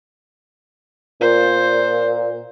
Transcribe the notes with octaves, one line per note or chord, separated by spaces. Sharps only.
A#2 C5